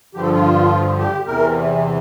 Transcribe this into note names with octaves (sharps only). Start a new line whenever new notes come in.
G2 D3 F3 G4
A4
F4
G4
E2 C3 E3 A#4